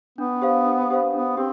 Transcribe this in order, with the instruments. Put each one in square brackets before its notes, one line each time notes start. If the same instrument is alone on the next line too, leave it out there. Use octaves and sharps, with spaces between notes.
[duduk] B3 [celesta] D4
[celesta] G4 C5 F5
D4
G4 C5 F5
[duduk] B3 [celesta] D4
[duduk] C4 [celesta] G4